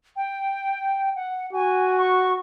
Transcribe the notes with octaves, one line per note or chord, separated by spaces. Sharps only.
G5
F#5
F#4 G#5
C#6